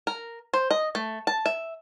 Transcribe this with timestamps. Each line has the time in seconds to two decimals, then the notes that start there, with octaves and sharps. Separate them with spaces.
0.07 A#4
0.53 C5
0.71 D#5
0.95 A3
1.27 A5
1.46 E5